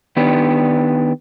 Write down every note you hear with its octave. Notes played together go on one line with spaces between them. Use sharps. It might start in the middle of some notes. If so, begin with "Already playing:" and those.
D#3 B3 D4 G4